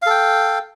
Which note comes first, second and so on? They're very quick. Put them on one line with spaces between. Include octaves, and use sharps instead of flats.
F5 A4 G5